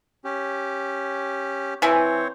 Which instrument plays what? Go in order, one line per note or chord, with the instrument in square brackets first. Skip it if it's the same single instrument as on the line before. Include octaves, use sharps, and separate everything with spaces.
[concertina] C#4 G4
[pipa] E3 E5 G#5 [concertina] C4 C#5